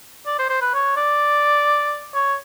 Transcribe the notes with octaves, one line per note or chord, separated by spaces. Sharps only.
D5
C5
C5
B4
C#5
D5
C#5